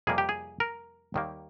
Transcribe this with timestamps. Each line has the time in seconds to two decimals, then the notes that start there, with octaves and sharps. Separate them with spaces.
0.07 F2 C3 G3 A#3 G#4
0.18 G4
0.29 G#4
0.60 A#4
1.14 D#2 D#3 G3 A#3